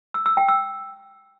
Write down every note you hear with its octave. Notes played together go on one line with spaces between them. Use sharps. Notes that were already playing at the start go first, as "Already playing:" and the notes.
E6
E6
G5
E6